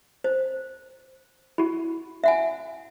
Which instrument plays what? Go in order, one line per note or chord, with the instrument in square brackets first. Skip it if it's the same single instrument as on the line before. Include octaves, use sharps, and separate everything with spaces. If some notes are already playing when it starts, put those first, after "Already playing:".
[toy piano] C5
[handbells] E4 F#4
[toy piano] E5 F#5 G#5